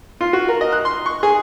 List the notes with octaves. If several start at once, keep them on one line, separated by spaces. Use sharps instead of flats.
F4
F#4
A#4
D#5
F#6
C6
C#6
G#4